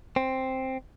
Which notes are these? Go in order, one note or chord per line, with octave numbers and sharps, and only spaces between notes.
C4